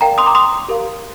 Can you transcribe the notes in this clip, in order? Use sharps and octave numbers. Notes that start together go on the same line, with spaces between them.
A#4 D5 F5 G5 A#5
C6 D#6
A#5 D6
C6 D#6
G4 A#4 F5